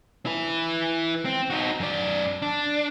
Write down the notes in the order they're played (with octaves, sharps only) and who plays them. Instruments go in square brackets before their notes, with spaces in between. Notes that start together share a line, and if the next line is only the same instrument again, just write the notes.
[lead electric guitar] E4 B4
C4
D#4 F#4
F#2 D5
D4